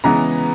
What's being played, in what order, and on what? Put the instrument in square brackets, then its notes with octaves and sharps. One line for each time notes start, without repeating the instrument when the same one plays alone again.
[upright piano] C#3 E3 G#3 B3 A#5